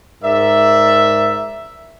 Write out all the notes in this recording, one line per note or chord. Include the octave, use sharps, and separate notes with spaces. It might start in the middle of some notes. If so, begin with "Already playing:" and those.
G#2 A#4 D5 E5